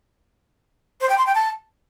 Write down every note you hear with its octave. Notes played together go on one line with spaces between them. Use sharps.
C5
G5
C6
G5
A5